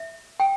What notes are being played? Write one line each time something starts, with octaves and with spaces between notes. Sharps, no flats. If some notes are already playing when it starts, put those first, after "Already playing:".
Already playing: E5
G5